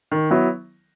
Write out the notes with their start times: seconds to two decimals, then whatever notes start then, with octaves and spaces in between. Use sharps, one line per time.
0.11 D#3
0.30 F#3 B3 E4